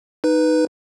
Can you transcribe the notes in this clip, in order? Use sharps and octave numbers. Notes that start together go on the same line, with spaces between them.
D#4 B4